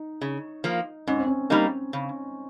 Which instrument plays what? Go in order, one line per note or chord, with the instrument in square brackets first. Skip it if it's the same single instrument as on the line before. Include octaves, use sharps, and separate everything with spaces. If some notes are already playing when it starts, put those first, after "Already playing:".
Already playing: [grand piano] D#4
[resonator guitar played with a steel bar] C#3
F3 A#3
[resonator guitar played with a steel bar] G#2 [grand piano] C#4
[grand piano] C4
C#4
[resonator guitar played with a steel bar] G3 A#3 D#4
C#3